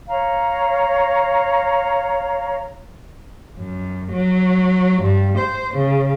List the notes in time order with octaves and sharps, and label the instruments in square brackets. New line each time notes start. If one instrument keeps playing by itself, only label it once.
[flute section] C#5 F5 A#5
[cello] F#2
F#3
G2
C5
C#3